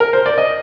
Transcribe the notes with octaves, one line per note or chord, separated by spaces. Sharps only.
A#4
C5
D5
D#5